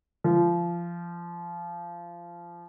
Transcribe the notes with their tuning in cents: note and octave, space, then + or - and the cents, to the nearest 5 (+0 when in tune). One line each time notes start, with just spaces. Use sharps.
F3 -20